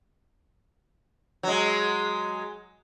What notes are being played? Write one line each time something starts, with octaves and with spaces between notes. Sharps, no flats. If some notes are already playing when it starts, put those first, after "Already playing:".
F#3 G#3